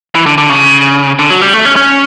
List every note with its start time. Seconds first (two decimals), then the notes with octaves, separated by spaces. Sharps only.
0.15 E3
0.26 D3
0.38 D3
0.50 C#3
1.19 D3
1.30 F#3
1.41 G3
1.53 A3
1.65 C#4
1.76 C#4